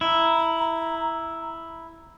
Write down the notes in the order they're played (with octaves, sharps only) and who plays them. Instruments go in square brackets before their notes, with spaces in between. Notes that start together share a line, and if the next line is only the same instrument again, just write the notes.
[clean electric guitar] E4 [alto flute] A#5